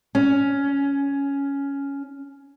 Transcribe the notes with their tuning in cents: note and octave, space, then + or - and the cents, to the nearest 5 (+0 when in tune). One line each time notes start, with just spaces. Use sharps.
C#4 +10